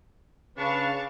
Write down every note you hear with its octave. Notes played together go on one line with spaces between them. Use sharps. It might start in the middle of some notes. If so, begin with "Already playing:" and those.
C#3 D4 B4 F5 A5 C#6